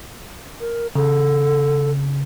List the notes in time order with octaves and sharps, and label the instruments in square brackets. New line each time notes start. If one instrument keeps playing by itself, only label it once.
[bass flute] A#4
[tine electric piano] C#3 [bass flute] A4